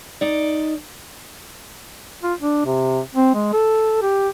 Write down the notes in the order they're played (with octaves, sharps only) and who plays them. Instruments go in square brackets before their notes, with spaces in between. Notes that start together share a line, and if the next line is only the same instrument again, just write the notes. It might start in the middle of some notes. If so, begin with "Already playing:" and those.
[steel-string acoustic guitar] D#4 D5
[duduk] F4
D4
C3
C4
G#3
A4
G4